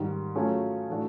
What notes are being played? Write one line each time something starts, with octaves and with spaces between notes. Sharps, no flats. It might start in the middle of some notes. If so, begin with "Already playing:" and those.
Already playing: G#2 D#3 G3
F#3 A3 C#4 F4 G#4
A2 E3 A3 D4 F#4